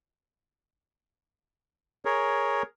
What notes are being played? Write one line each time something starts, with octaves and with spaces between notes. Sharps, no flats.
G#4 A#4 C#5